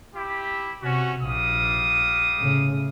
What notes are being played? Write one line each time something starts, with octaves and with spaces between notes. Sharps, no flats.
E4 G4
C3 C#4 F#4
A#1 G3 F5 D#6
A2 C#3